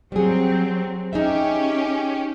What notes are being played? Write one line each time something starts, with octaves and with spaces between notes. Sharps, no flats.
F#3 G3 C4 G#4
C#4 D#4 G4 G#4 E5